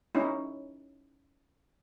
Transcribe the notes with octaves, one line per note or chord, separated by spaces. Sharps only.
C#4 D#4 E4